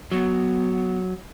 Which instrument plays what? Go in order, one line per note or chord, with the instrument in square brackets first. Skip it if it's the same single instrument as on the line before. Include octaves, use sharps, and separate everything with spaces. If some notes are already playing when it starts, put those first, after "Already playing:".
[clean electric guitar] F#3 [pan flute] B3